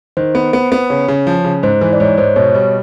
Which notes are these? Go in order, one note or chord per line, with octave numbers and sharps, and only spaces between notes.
D#3 C5
B3
B3
B3
C#3 C#5
C#3
F3
C#3
G#2 C5
E3
D5
G#2 C#5
G#2 C5
B2 C#5
G3